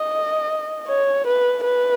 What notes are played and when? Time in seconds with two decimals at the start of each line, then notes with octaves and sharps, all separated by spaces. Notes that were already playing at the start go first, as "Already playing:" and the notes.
Already playing: D#5
0.88 C#5
1.26 B4
1.64 B4